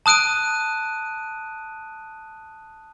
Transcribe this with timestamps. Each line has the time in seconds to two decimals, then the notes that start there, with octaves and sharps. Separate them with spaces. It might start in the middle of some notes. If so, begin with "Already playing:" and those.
0.06 A5 D#6 F#6 D7 D#7